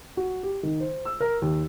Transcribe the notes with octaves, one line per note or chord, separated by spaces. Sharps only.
F#4
G4
D#3
C5
E6
A#4
D#2